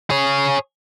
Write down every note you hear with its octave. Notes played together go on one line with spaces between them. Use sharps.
G#4 C#5